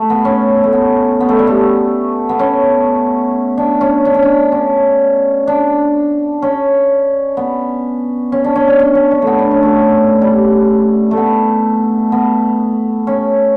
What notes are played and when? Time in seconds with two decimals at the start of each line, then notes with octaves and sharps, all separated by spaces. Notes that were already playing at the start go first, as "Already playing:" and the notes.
Already playing: A3
0.10 B3
0.25 C#4
0.63 A3
0.73 B3
1.20 B3
1.29 A3
1.39 G3
1.47 A3
2.29 B3
2.39 C#4
3.58 D4
3.81 C#4
4.05 D4
4.14 C#4
4.23 D4
4.52 C#4
5.47 D4
6.42 C#4
7.37 B3
8.32 C#4
8.44 D4
8.56 C#4
8.68 D4
8.79 C#4
8.95 C#4
9.11 D4
9.22 A3 B3
9.39 D4
9.51 C#4
9.63 A3
10.22 G3
11.11 A3
11.17 B3
12.12 B3
13.07 C#4